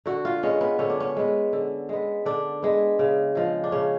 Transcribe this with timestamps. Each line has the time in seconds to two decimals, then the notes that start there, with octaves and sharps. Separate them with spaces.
0.06 D3 F#4
0.25 F4
0.43 G#3 B3 C#4
0.61 B3
0.79 D3 C#4
0.90 D4
1.00 C#4
1.16 G#3 B3
1.53 D3
1.89 G#3 B3
2.26 D3 D4
2.62 G#3 B3
2.99 C#3
3.35 F3 G#3
3.64 D4
3.72 C#3 C#4